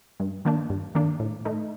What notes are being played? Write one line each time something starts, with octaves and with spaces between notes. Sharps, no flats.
G2
D#3 A#3 D4
G2
D#3 A#3 D4
A2
A3 D#4